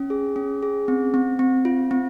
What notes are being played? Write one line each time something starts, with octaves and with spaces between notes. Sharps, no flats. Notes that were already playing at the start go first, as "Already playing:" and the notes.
Already playing: C#4
G#4
C#4
G#4
C4
C4
C4
F4
C4